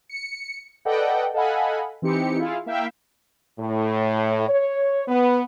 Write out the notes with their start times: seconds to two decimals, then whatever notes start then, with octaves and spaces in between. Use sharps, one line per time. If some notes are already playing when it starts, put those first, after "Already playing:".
0.09 C#7
0.85 A4 B4 D5 D#5 F#5 G5
1.34 A4 D#5 F5 F#5 G#5 B5
2.02 E3 C4 D#4 G4 C#7
2.38 E4 F4 G#4 F5
2.66 A#3 E4 E5 F5 G5
3.59 A2
4.48 C#5
5.08 B3